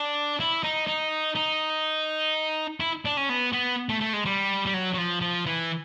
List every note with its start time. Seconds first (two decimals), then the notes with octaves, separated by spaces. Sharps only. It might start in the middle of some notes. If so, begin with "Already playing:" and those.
Already playing: D4
0.40 E4
0.64 D#4
0.87 D#4
1.35 D#4
2.80 E4
3.05 D4
3.17 C#4
3.29 B3
3.53 B3
3.89 A3
4.01 A3
4.13 G#3
4.25 G3
4.66 G3
4.74 F#3
4.93 F#3
4.98 F3
5.21 F3
5.46 E3